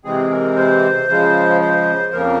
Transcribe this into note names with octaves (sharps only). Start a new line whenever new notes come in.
C3 E3 G#3 C4 G#4
A#4
C5
C#3 F3 G#3
C5
F2 C#3 F3 A#3 A#4